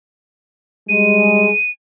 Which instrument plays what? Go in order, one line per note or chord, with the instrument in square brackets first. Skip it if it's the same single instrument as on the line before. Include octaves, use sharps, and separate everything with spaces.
[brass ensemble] G3 G#3 [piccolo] D#7